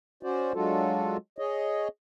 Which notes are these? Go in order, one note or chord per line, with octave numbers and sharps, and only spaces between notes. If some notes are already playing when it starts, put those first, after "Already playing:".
C#4 F#4 C5 D5
F#3 G#3 D4 F4 F#4 A4
G#4 C#5 D#5